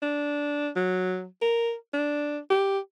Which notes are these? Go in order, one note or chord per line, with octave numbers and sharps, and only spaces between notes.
D4
F#3
A#4
D4
G4